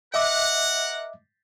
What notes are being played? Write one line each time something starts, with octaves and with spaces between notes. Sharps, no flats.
A#4 D#5 E5 F#5 D6